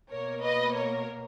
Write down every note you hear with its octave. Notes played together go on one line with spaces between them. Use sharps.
B2 A#3 A#4 C#5
B4 D#5
A#4 C#5